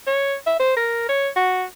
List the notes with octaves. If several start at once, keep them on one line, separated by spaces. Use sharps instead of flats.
C#5
E5
C5
A#4
C#5
F#4